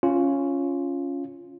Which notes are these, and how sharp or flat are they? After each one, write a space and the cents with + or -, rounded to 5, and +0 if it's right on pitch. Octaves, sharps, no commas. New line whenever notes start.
C#4 +0 F4 -5